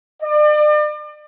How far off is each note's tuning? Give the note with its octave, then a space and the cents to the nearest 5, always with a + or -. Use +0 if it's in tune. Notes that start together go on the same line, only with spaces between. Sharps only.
D5 +40